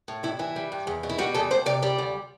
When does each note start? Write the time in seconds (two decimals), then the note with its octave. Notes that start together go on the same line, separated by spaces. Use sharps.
0.08 A2
0.23 G2 E4
0.39 E3 E4
0.56 G3
0.72 G2
0.87 E2
1.03 B2
1.09 E4
1.18 G3 F#4
1.34 E2 A4
1.51 D2 C5
1.66 C3 D5
1.82 G3 D5
1.98 D2